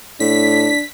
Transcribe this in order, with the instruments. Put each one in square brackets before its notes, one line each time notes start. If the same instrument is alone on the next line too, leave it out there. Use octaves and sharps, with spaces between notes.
[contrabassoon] A2 [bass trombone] D4 [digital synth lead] B6